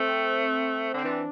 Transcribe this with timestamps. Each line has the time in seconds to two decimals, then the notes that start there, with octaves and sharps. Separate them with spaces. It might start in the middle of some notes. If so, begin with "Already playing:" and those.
Already playing: A3 C4
0.94 D3 C4
1.03 E3 D4